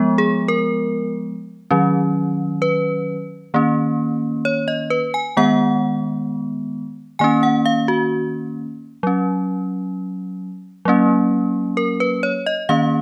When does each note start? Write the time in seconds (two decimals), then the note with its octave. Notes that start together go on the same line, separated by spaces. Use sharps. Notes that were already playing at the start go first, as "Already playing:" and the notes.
Already playing: F3 G#3 B3
0.18 G#4
0.48 A#4
1.71 D#3 F#3 C#4
2.62 B4
3.54 D#3 A#3 C#4
4.45 C#5
4.68 D#5
4.90 B4
5.14 G#5
5.37 D#3 G#3 B3 F#5
7.19 D#3 A#3 C#4 G#5
7.43 F#5
7.66 F5
7.88 F#4
9.03 F#3 C#4
10.85 F#3 A#3 C#4
11.77 A#4
12.00 B4
12.23 C#5
12.46 D#5
12.69 D#3 A#3 C#4 F5